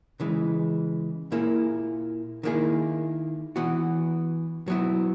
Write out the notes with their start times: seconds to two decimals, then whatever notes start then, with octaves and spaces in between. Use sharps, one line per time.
0.20 C#3 E3 G#3
1.32 A#2 A#3 E4 G#4
2.43 D#3 A#3 E4 G#4
3.56 E3 B3 F#4
4.68 F#3 B3 E4